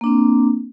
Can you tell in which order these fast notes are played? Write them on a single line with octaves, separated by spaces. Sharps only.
A#3 D4 C4